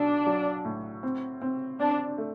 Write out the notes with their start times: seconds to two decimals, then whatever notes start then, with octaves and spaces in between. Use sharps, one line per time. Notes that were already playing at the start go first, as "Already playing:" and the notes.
Already playing: B1 D4
0.27 F#3
0.65 A2
1.03 C4
1.42 C4
1.80 C4 D4
2.18 A3